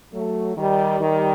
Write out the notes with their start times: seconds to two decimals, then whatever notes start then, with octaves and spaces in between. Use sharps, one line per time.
0.12 F#3 A3
0.57 D#3 G3
1.00 D#3 G3